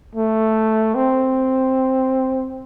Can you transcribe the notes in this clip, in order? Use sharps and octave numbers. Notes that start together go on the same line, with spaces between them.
A3
C4